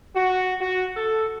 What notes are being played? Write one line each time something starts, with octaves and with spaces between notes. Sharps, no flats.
F#4
F#4
A4